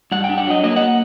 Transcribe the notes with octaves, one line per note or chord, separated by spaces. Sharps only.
G2 F#5
G5
D4
F#5
F#3 D#5
A#3 D#5
F#5